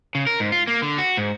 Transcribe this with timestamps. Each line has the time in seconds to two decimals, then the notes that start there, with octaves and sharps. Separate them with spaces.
0.15 C#3
0.27 A#4
0.40 G#2
0.52 F4
0.67 A#3
0.82 D3
0.98 F#4
1.17 G#2